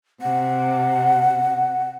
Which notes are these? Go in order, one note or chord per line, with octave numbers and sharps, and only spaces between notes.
C3 F#5